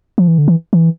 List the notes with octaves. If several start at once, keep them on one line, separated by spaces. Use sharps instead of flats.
F3
E3
D3
E3
E3